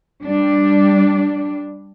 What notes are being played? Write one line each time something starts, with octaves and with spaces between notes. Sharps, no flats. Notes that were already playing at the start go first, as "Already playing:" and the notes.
G3 D4